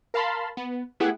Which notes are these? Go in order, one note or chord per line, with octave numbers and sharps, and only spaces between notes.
A#4 F5 A5 B5 C6
B3
A3 B3 E4 G4 G#4 F#5